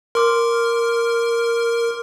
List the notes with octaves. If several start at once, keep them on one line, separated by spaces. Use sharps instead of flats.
A#4 C6 D6 F6